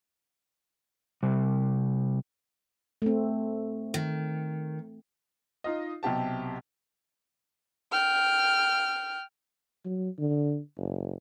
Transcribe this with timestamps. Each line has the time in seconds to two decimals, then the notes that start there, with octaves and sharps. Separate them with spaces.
1.23 C3 G3
3.02 A3 C4
3.94 D#3
5.64 D#4 F4 D#5
6.03 B1 C3 G4 A5
7.92 G5 F6
9.85 F#3
10.19 D3
10.77 F#1